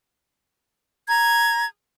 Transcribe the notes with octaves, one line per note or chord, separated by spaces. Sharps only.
A#5 G#6